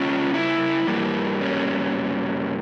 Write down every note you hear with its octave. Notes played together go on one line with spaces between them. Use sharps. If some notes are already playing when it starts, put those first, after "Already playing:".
Already playing: C#3 G3 A#3 C#4 F4
E4
G2 G3 A#3
C#4